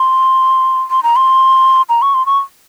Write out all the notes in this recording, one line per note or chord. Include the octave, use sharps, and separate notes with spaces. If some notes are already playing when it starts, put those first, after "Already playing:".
Already playing: C6
C6
A#5
C6
A#5
C#6
C6
C#6